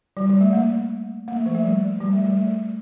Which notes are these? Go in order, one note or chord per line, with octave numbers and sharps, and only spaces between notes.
G3
G3
A3
A#3
A#3
A3
F3
A3
G3
G3
A3
G3
A3